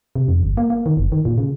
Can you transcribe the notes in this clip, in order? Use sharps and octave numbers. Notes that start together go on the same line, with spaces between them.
C3
F2
G1
A#3
A#3
D#3
F#1
D#3
A#2
C#3